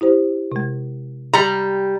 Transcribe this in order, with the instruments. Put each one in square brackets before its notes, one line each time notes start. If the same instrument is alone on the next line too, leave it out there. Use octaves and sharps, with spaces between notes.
[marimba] E4 G4 C5
C3 G#3
[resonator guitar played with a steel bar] G3 A#5